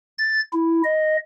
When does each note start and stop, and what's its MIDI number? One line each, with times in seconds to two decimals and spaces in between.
0.19 0.41 93
0.53 0.82 64
0.84 1.17 75